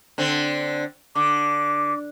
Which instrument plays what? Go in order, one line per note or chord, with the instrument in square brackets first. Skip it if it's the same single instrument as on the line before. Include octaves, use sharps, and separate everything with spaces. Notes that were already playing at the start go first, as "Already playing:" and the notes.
[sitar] D3 C4
[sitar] D3 [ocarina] D6